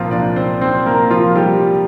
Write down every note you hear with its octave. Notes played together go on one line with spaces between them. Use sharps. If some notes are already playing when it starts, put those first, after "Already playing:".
Already playing: C2 A#2 F3 A#3 C4 F4
D4 D5
C4 C5
C4 C5
A#3 A#4
F3 F4
G3 G4